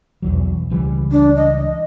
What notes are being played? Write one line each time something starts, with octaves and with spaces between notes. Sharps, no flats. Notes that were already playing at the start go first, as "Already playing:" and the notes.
B1 E2 F#3
C#2 E3 G3
D4
D#5